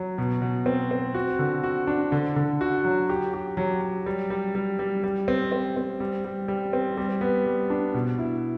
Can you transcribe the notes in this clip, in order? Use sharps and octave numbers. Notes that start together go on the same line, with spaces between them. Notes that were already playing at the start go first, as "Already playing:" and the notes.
Already playing: F#3
B2
B2
C4
C4
F#4
D3
F#4
D4
D3
D3
F#4
F#3
G4
G4
F#3
F#3
G3
G3
G3
G3
G3
C4
C4
C4
G3
G3
G3
C4
G3
B3
G3
D4
B2
E4